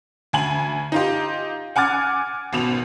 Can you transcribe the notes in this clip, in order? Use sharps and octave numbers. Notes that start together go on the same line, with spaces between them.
D2 G#5 F#7
D#4 F4 G4
F#5 G#5 D6 F6 A6
G#1 B2 E7 F7